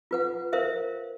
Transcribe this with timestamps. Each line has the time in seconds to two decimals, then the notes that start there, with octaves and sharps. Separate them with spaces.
0.11 F4 B4 F#5
0.53 A#4 C5 E5 F5